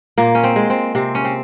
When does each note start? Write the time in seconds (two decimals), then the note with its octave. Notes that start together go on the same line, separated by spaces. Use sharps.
0.18 A#2 A#3
0.35 C#4
0.44 C4
0.56 G#3
0.70 C4
0.95 C3 C4
1.15 C#4
1.25 C4